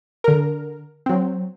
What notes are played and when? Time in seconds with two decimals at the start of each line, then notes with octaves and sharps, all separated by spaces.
0.24 D3 A#4
1.06 F#3 C4